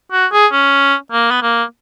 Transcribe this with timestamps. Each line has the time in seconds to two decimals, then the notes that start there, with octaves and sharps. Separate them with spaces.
0.12 F#4
0.33 G#4
0.52 C#4
1.12 A#3
1.31 B3
1.42 A#3